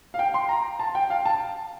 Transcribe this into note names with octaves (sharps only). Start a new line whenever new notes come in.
F5
G5
C6
A#5
A5
G5
F5
A5